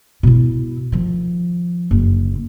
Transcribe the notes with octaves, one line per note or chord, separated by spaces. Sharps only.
B2 E4
D#3 F3
F#1 D3